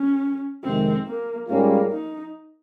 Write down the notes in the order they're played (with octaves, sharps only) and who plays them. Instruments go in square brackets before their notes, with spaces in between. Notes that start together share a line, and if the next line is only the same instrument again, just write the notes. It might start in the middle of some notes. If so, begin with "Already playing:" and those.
Already playing: [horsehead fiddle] C#4
[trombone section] F2 C3 D#3 G#3 [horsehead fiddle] C4
[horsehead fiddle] A#3
[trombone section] G#2 G3 C#4 F4 G#4 [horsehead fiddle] A#3
[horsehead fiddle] D#4